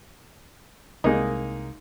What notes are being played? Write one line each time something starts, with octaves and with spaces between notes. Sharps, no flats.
C2 G#3 A#3 D#4